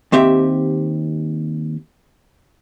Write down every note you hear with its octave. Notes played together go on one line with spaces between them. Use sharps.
D#2 C4 G4 E5